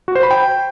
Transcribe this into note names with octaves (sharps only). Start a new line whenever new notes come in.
F#4
C5
B5
G5